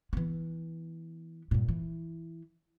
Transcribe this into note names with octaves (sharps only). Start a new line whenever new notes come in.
E3 B3
G2 A#2
E3